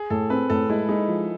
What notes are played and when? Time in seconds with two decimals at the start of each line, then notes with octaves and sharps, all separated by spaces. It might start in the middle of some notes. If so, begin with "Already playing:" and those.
Already playing: G#4
0.10 A2 A4
0.30 C4 B4
0.50 A2 A4
0.69 G#3 E4
0.89 G#3 D#4
1.08 F3